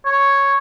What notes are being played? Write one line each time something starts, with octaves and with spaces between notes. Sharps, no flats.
C#5